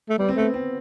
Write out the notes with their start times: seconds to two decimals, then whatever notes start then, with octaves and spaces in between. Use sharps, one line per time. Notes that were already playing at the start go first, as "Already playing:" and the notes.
0.09 A3
0.18 G3 B3
0.28 C4
0.36 A3 B3
0.54 C4